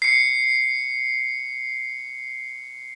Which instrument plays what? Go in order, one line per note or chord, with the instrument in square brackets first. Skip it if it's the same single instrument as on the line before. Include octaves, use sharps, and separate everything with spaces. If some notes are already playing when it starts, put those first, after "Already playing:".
[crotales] C7 C#7